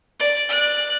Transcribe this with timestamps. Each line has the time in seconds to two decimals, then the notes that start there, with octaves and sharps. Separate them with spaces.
0.20 D5
0.49 D5 F#6